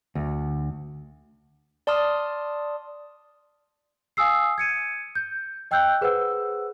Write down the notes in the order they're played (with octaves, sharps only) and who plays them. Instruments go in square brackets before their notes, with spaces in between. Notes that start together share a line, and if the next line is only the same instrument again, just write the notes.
[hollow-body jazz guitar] D2
[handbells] D5 A5 C6 D#6 F6
[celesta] F5 G#5 D#6 E6 C7
G#6 C#7 D#7
G6
D#5 G5 E6 F#6 G6
G#4 B4 C5 F#5 E6